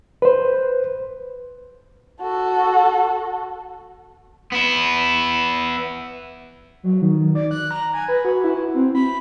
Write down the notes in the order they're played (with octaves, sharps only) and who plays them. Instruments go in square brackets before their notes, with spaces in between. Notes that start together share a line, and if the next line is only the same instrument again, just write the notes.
[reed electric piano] B4 C5
[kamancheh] F#4 A4
[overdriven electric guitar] B3 E4
[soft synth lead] F#3
D#3
D5
F#6
A#5
G#5
B4
F#4
E4
C4
B5